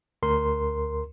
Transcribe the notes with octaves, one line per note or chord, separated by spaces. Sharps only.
D2 A#4 C6